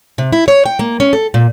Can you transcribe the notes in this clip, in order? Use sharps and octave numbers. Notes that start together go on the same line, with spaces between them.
C3
E4
C#5
G5
A#3
C#4
A4
A#2